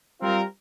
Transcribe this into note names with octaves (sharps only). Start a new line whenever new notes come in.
G3 C4 F4 A#4